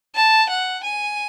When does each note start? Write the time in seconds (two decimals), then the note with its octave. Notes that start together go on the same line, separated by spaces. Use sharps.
0.15 A5
0.49 F#5
0.83 G#5